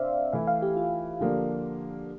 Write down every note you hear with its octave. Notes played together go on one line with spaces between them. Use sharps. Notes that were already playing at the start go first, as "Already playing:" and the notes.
Already playing: C3 D4 C5 D5 E5 F5
E3 A3 E4 F5
F5
G4
F4
D3 F3 A#3 D4 G4